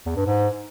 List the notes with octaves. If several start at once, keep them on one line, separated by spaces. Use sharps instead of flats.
E2
G2
G#2